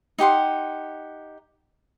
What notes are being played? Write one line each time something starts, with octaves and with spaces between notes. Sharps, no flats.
D#4 G4 F#5 C6